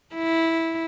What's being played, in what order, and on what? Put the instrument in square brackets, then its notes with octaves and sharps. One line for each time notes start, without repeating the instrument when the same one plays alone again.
[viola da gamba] E4